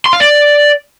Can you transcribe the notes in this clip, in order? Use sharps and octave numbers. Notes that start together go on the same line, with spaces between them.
C6
F5
D5